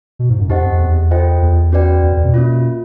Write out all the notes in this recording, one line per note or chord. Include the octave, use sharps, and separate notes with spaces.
B2
G#2
F#2
F2 D#4 G4 C5 D#5 F#5
F2
E2
F4 A4 C5 D#5 G5
E2
C#4 F#4 B4 D5 G5
E2
F2
B2
A#3 C#4 F4